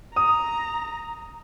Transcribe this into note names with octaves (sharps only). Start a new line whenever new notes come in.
A#5 D#6